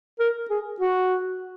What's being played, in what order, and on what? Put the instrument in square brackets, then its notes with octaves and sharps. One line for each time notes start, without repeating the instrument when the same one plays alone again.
[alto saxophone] A#4
G#4
F#4